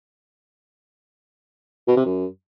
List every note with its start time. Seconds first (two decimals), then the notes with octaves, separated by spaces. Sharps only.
1.87 B2
1.96 C3
2.05 F#2